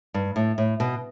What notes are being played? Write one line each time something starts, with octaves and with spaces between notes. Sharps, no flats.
G2
A2
A2
B2